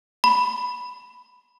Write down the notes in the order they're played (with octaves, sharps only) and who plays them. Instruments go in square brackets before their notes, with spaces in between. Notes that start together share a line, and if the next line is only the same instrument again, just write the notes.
[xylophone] B5